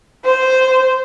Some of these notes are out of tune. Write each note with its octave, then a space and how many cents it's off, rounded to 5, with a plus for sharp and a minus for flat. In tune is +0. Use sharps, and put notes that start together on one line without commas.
C5 -10